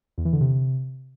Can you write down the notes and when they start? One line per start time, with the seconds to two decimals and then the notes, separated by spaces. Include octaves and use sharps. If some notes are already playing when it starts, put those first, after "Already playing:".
0.18 E2
0.25 E3
0.33 D3
0.41 C3